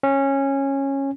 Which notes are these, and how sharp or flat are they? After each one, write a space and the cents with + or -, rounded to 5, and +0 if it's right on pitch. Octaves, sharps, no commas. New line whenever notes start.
C#4 -15